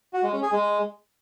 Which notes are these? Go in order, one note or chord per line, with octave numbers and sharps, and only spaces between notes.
F#4
G#3
C#4
G#4
G#3